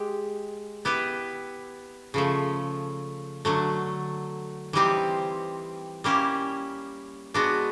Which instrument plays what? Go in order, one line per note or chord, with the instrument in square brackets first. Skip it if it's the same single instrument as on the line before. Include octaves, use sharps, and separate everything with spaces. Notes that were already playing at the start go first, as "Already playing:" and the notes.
Already playing: [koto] G#3 G4
B3 E4 G4 B4
C#3 F3 A3
D3 F#3 A3
E3 G3 C4 D#4 G4
G3 A#3 C#4 E4 G4
G#3 B3 D4 F#4